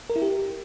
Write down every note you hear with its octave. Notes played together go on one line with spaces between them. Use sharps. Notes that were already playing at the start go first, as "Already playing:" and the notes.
A#4
E4
G4